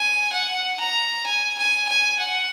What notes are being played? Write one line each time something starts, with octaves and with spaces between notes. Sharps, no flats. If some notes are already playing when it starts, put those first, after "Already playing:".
Already playing: G#5
F#5
A#5
G#5
G#5
G#5
F#5